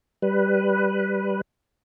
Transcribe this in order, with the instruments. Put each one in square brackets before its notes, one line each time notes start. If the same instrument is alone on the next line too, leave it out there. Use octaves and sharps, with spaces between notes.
[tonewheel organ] G3 B4